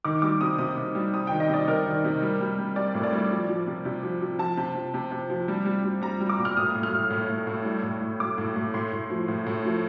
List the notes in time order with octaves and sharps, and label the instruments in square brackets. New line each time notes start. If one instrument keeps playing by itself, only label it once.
[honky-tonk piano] D#3 D6
G3 D6
C3 D#6
C3 D#6
C3
G3
C3 D#6
D#3 G5
D#5
C3 D5
C3 A#4
D#3
C3
G3
G3
G3
G3 D5
A2
D5
G3
F3
F3
C3
C3
F3
F3
F3 A5
C3
C3
C3
C3
F3
G3
G3
G3
G3 A#5
G3
D6
A#2
F6
A2 D#6
A2
F6
A2
A2
A2
A2
G3
A2
A2
A2 D6
A2
A2
A2 C6
A2
F3
A2
A2
F3